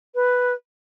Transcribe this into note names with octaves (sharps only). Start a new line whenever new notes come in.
B4